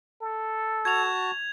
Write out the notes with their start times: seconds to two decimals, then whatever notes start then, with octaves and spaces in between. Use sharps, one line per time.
0.22 A4
0.85 F#4 A5 G#6 F7